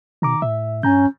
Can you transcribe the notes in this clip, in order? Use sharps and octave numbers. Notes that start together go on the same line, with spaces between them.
B2 D#3 A#5 D6
A2 E5
G2 C#4 G#5 A#5 G6